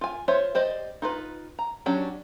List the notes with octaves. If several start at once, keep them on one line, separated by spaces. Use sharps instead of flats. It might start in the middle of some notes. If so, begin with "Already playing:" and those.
F4 G#5
F4 C5 C#5 E5
G4 C5 D5 D#5
D#4 F4 B4
A#5
F#3 C#4 D4 G4